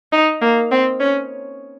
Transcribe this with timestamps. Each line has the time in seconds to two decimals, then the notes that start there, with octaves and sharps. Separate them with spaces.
0.12 D#4
0.41 A#3
0.71 C4
1.00 C#4